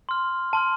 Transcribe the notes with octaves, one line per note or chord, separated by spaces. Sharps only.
C6 F6
A5 C6 F6